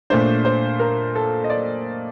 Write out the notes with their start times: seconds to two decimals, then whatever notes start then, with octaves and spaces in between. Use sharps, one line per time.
0.10 A#2 A3 D4 C5
0.45 C5
0.80 A#4
1.16 A4
1.44 D#5
1.50 D5